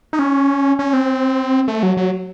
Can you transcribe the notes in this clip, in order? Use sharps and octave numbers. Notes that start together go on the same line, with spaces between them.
D#4
C#4
C#4
C4
A3
F#3
F#3